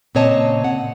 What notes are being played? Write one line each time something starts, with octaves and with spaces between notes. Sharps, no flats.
A#2 C#3 C4 C#5 D#5 A5
F#5